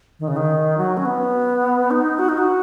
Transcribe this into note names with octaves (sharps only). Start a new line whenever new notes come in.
D#3
C#3
D#3
F#3
C#4
B3
D#4
F#4
D#4
F#4